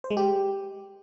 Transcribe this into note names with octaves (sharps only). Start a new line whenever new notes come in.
C5
G#3
G4